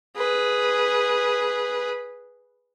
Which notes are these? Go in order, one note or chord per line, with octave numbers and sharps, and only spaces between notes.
G#4 B4